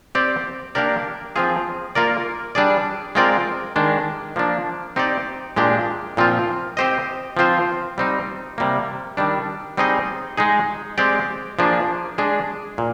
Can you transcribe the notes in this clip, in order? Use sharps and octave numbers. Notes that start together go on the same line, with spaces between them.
C4 G4 D5
A#3 D4 G4 A#4 D5
F3 C4 F4 G#4
A#3 F4 A#4 D5
G3 D4 G#4 D5
G#3 C4 F4 A#4 D5
D#3 G#3 D4
F3 A#3 D4
C4 D#4 G4 D5
A#2 G#3 D4 G4
A#2 F3 C4 F4
C4 G4 C5 D#5
F3 C4 F4 C5
G3 C4 D#4
C3 G3 A#3
D#3 G3 D4
G3 C4 D#4 G#4 D#5
G#3 D#4 G#4
G#3 C4 G4 D5
F3 A#3 D4 G#4
G#3 D4 G#4
A#2